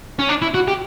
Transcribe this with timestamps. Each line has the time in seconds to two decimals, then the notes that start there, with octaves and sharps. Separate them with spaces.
0.19 C#4
0.29 D4
0.42 E4
0.54 F#4
0.68 G4